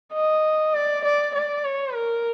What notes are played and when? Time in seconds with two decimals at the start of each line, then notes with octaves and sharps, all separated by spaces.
0.14 D#5
0.74 D5
1.04 D5
1.34 D5
1.64 C#5
1.95 A#4